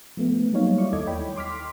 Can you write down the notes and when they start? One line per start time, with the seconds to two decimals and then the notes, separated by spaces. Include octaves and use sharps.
0.17 F3 A3 B3
0.52 F#3 G3 A#3 D#4 C#5 F5
0.78 E4 D5 C#6
0.93 D#2 A4 D#5 D6 G#6
1.07 C#5 G5 B5
1.36 C6 D6 F6 B6